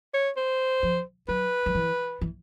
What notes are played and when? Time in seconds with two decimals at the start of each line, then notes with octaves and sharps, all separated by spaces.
0.14 C#5
0.37 C5
0.83 F3
1.28 F#3 B4
1.66 F3
1.75 E3
2.21 E3